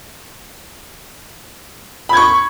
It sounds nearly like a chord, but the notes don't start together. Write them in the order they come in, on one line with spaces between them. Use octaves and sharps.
B5 G#6 C#6